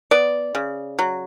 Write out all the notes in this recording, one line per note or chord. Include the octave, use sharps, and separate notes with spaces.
B3 D5
C#3
F#3